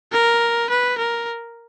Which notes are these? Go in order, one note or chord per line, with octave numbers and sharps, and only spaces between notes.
A#4
B4
A#4